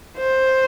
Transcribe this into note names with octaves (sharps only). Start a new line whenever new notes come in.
C5